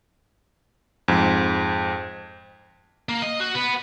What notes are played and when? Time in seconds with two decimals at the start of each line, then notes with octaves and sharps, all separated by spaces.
1.08 F2 G#2
3.09 A#3
3.22 D#5
3.40 F#4
3.55 B3